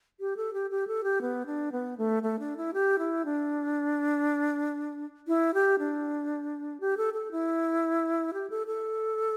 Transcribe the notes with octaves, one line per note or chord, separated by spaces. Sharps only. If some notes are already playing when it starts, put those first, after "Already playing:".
G4
A4
G4
G4
A4
G4
B3
D4
B3
A3
A3
D4
E4
G4
E4
D4
E4
G4
D4
G4
A4
A4
E4
G4
A4
A4